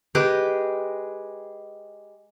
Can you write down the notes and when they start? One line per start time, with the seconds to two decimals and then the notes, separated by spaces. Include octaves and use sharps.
0.15 G#3 G4 B4 D6